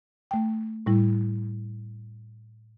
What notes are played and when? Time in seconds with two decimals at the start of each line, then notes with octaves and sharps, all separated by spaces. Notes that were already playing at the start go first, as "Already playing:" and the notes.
0.31 A3 G5
0.86 A2 G3 E4